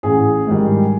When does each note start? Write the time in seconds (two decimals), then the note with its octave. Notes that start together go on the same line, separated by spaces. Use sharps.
0.03 A1 G#4
0.47 G#2 D#3 G3